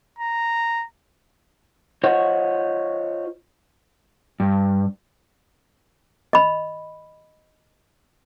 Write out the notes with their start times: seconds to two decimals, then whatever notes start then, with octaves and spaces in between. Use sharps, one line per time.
0.19 A#5
2.04 F4 C5 C#5 D#5 F#5
4.40 G2
6.33 D#5 B5